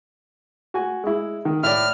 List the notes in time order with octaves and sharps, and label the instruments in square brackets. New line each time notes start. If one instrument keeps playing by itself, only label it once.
[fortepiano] F#4 G#5
G#3 E4
D#3
[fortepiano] A2 D5 [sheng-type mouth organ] F6